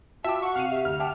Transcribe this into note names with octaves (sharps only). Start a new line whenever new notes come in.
F4 F#4 E5 G5 A5 D6
F#5 C#6
C3 F5 D#7
G4 E5
D2 F6
E5 F#5 G5 A5 D6